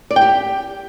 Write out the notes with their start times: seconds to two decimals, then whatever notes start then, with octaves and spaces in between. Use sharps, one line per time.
0.11 D5
0.16 G5
0.22 G4